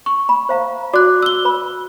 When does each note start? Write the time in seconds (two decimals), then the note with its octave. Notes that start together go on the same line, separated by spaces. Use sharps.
0.06 C#6
0.29 B5
0.49 C5 F5 A#5
0.93 F#4 D5 D6 F#6
1.22 E6 G7
1.45 B4 B5